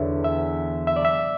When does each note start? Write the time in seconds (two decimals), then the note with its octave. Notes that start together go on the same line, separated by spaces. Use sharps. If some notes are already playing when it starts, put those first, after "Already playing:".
Already playing: E2 D3 B4 C#5 D5 E5
0.24 E5
0.87 E5
0.96 D5
1.05 E5